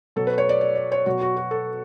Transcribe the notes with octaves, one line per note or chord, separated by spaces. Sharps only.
B2 F#3 A4
B4
C#5
D5
D5
D5
C#5
B2 F#3 F#4
F#4
F#4
A4